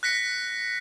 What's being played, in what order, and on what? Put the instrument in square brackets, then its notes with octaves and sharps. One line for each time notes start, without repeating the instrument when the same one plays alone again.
[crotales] F#6 A#6 B6 C#7